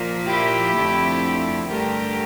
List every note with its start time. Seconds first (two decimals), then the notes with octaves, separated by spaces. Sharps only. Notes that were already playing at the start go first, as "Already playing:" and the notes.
Already playing: A#2 F3 A#3
0.27 E4 G4
0.75 F2 D3 A3 C4
1.68 G2 D3 A3 G4 A#4